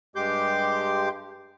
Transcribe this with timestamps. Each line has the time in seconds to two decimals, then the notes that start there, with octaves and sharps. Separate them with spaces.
0.16 G2 G#3 G4 C6 D6 G6